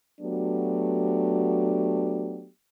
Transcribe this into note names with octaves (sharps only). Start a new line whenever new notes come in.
F#3 A3 B3 D4 F#4 G4